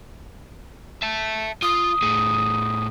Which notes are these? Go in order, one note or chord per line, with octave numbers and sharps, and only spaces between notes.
E5 A5
F4 D#6
A2 G#4